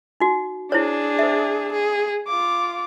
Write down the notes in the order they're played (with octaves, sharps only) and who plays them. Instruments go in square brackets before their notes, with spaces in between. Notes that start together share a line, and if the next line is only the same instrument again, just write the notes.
[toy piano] D#4 F#4
[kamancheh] D4 G#4 [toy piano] E4 C5 C#5
[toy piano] C5 E5
[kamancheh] G#4
F4 D6